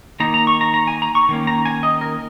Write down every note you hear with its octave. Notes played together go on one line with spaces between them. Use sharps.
D#3 A#3 D#4 A#5
A#5
C#6
A#5
A#5
G#5
A#5
C#6
D#3 A#3 C#4
A#5
G#5
D#5
A#4